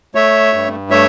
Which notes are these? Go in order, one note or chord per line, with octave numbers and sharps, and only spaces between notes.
A3 C#5 E5
G2
A3 C#5 E5